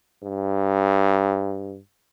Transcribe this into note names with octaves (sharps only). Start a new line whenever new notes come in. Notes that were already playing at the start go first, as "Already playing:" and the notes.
G2